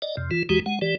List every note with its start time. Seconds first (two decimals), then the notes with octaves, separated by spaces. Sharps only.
0.02 D5 D#5
0.17 F2 C3
0.31 E3 F4
0.49 D#2 E3 G#3 F#4 G4
0.66 G#3 F#5
0.82 E3 G4 D5